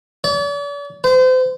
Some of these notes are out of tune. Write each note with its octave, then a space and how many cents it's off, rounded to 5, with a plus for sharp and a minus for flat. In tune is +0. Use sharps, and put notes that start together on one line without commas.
D5 -45
C5 -35